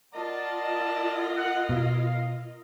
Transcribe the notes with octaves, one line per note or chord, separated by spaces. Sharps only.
F4 A#4 D5 D#5 F#5 A5
F#5
B2 F5